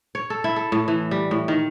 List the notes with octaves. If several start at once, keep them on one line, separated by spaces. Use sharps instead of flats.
C#5
A4
E4
A4
A2
E3
G3
A2
D#3